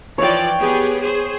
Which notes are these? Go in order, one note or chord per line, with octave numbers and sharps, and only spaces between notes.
E3 F3 C#5 D5 G5
B3 G4 G#4
G#4 C5